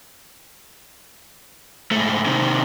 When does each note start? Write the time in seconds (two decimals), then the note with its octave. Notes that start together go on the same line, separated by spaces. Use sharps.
1.92 G#2 A3
2.26 C3 D#3